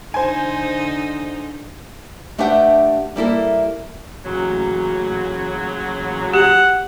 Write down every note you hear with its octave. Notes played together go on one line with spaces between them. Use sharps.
D3 D#4 C5 G#5
A3 D4 G4 B4 E5 F#5
G3 A#3 E4 A4
A1 A#2 C#3 F#3
G4 F#5